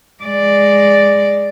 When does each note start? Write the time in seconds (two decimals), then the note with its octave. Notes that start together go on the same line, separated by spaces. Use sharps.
0.23 G#3 D5